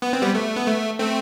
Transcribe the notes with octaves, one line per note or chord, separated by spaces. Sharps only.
B3
C4
G3 B3
A3
B3
A3
A3 C4